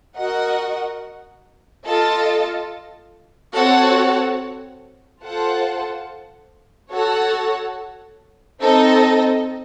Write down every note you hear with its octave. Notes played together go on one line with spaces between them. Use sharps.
F#4 A#4 D#5 F#5
F4 A4 D#5 A5
C4 F#4 A4 C#5 F#5
F4 A4 C5 F#5 A5
F#4 A4 C#5 F#5 A5
C4 D#4 A4 D#5